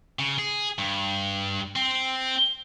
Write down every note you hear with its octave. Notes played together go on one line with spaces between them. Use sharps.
C#3
G#4
G2
C4